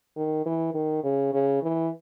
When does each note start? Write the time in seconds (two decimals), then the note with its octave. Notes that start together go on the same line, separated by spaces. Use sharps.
0.16 D#3
0.46 E3
0.74 D#3
1.03 C#3
1.33 C#3
1.63 E3